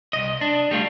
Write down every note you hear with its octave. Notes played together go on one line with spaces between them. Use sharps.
C2 D#5
D4
G3 A3 F4